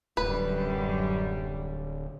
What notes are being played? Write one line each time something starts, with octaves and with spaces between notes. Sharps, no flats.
D1 F#2 G3 B4